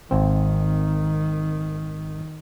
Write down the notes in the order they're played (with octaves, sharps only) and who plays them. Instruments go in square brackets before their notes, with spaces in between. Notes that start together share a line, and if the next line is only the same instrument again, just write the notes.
[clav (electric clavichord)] G#1 C4 [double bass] D#3